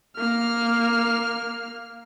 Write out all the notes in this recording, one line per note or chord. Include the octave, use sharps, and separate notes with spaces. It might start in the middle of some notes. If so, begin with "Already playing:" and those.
A#3 F6